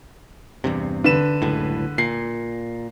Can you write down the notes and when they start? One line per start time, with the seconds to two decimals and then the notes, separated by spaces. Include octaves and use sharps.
0.64 E2 G2 C3
1.04 D3 B4 E7
1.42 F#1 C#2 A2
1.98 A#2 C7